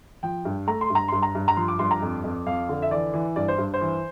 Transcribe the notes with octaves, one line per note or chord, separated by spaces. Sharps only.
F3 G5
G2
A3 A#5
C6
G2
A#5
G2 C6
A#5
G2
A#5
F3 C6
D6
G2 C6
A#5
F2
F2
F2 F5
D3
E5
E3 D5
E3
G2 D5
C5
G2
C5
E3